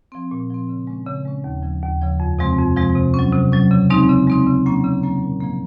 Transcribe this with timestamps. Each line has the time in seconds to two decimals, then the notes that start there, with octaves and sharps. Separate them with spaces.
0.12 F3 C4
0.31 A#2
0.50 F3 C4
0.69 C#3
0.87 G#3 C#4
1.06 C#3
1.25 G#3 C#4
1.44 D#2
1.63 C#3 F3
1.82 D#2
2.01 C#3 F3
2.20 F2
2.39 C3 F3 G#3 C4
2.58 F2
2.76 C3 F3 G#3 C4
2.96 C3
3.14 F#3 C#4
3.33 C3
3.52 F#3 C#4
3.71 C#3
3.90 G#3 C4 D#4
4.09 C#3
4.27 G#3 C4 D#4
4.47 C#3
4.66 F#3 A#3 C#4
4.84 C#3
5.03 F#3 A#3 C#4
5.23 A#2
5.40 F3 A#3